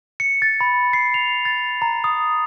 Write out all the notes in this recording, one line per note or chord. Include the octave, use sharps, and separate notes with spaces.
C#7
A6
B5
C7
F7
A6
A#5
D#6